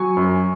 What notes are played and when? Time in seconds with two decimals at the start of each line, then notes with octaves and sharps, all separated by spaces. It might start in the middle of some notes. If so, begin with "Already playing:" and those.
Already playing: F#3 G#5 C#6
0.17 F#2